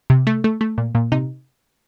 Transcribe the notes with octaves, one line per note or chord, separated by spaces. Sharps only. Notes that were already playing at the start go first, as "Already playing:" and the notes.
C3
A3
A3
A3
A#2
A#2
C3 D#4